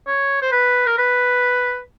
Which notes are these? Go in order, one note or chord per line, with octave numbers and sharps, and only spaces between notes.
C#5
C5
B4
A#4
B4